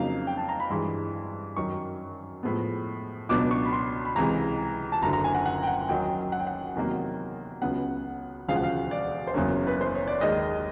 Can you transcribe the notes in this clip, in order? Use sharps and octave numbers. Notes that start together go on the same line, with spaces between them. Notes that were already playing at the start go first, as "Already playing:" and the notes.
Already playing: F2 C#3 F#3 A#3 D#4 F5
G5
A5
A#5
B5
G2 E3 G#3 C6
F#2 D#3 F#3 C#6
A2 F3 G#3 B3
C#2 B2 F#3 B3 D4 D6
C#6
B5
C6
B5
C#2 C3 E3 G#3 A#5
A5
F#1 F#2 D3 A#5
A#5
G#5
F#5
F#5
G5
F#5
F#2 D#3 F#3 G5
F#5
G5
F#5
E2 C3 D#3 F#3 A#3
C#2 C#3 F#3 B3 F#5
E1 D2 C#3 F3 G#3 F5
F#5
F5
D5
C5
F#1 E2 C#3 F#3 A#3 C#5
B4
C5
C#5
D5
D#2 D#3 G#3 D#5